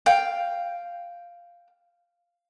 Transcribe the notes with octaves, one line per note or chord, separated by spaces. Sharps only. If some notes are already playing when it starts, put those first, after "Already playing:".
F5 G5